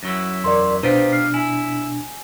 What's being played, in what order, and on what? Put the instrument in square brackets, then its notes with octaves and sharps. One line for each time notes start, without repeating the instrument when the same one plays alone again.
[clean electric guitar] F#2 F#3 E4
[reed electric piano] E2 A#4 D5 [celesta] C6
[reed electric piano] B2 D4 [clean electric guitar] D#4 F4 G4 [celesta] B4 C5
[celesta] F6 C7
[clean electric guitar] E4 [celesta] G#5